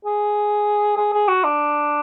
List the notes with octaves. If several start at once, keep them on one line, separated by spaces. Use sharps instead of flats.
G#4
G#4
G#4
F#4
D4